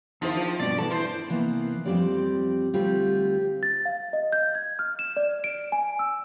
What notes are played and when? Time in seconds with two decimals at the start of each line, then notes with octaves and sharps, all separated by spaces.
0.22 E2 D#3 F3 E4 C5
0.34 D4 F4
0.60 G2 B2 D4 D5
0.78 E3 B3 A4 A5
0.91 B3 E4 C5
1.29 C3 E3 A#3 B3
1.85 F2 B2 G3 C4 G4 D5
2.74 D2 G3 C4 F4 G4
3.63 A6
3.85 F5
4.13 D#5
4.32 G6
4.55 G#6
4.79 F6
4.99 E7
5.17 D5
5.44 D7
5.72 G#5
5.99 E6